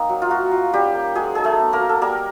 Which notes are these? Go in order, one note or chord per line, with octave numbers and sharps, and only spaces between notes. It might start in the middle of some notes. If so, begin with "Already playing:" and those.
Already playing: A#3 C4 D#4
F#3
F4
A#3 F#4
F4
G3 C#4 G4
A#3
F#3 G#3 G#4
D#4 G#4
A3 A4
B3
A#3 A#4
F#3
A4
G3 A#3 A#4